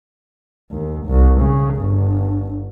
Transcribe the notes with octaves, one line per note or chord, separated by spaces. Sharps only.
D#2
C2
C#3
G1